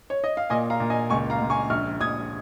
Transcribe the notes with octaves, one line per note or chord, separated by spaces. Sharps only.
C#5
D#5
F5
A#2 D#5 G#5
F5 A#5
A#2
D#5 G#5
C#2 G#5 C#6
F5 A#5
C#2
G#5 C#6
A#1 C#6 F6
A#1 D#6 G#6